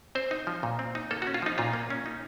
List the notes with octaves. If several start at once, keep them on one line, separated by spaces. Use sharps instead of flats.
C4 C5
D#4
F3
A#2
C4
D#4
A#3 A4
F#4
C#4
F4
F3 D#4
A#2 F4
A#3
C#4
D#4